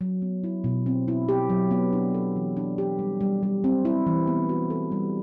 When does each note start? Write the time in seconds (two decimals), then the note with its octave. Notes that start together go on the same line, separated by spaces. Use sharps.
0.01 F#3
0.22 B3
0.44 E4
0.64 B2
0.86 C4
1.08 E4
1.29 G4
1.50 F#3
1.71 B3
1.93 D4
2.14 A4
2.36 E3
2.57 D4
2.78 G4
2.99 G3
3.21 G3
3.43 G3
3.64 C4
3.85 E4
4.07 E3
4.27 B3
4.49 F#4
4.70 A4
4.92 G3